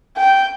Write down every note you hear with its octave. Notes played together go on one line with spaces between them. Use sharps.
G5